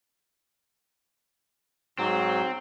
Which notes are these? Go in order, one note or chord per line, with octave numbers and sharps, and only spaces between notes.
G#2 F#3 C4